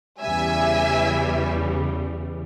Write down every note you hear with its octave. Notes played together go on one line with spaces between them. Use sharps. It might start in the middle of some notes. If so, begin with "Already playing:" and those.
E2 C#3 E3 G3 E5 G#5